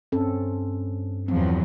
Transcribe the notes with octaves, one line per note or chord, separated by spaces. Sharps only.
G2 C4 C#4 A4
E2 F3 F#3 C4